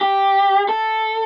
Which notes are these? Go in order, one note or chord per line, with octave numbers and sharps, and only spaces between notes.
G4
A4